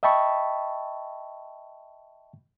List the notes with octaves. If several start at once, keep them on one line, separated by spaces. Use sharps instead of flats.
D#5 E5 G5 A5 B5 C#6